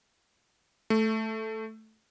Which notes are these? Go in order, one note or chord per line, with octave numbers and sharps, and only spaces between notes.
A3